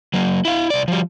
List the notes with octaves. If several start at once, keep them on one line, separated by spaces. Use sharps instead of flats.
F#3 A#3
E4 F5
C2 D5
F3 G3